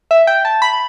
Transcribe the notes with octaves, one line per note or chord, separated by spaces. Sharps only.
E5
G5
A5
B5